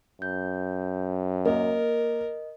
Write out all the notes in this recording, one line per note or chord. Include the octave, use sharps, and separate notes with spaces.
F#2 G6
A#3 A#4 D#5